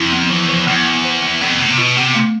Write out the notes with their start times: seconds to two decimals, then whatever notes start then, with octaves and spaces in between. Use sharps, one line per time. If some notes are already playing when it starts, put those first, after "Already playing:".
Already playing: F2 E4
0.12 B3
0.30 E2 F3
0.49 F3
0.67 E2 B3
0.85 B3
1.04 C5
1.23 B3
1.41 F2 B3
1.59 A2 B3
1.70 C3
1.78 B2 F4
1.96 C3 B3
2.14 A3